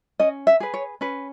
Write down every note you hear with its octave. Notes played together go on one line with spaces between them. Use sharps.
C#4 D#5
E5
G#4 B4
C#5
C#4 B4